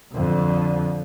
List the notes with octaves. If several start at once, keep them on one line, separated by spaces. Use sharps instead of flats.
F2 D3